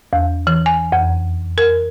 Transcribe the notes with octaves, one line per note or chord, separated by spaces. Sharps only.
E2
E3
G#5
F2
A#4